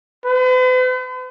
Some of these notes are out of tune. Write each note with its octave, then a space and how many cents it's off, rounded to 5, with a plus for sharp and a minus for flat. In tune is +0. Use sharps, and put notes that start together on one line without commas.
B4 +45